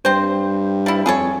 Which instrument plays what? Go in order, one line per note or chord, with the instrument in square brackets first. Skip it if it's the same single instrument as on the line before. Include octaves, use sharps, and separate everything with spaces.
[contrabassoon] G2 [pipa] C4 C5
[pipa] F3 E4
[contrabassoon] F2 [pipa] G#4 A4 C#5